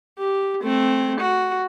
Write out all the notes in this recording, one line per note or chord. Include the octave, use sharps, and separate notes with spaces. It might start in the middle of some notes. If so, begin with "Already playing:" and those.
G4
A3 C4
F#4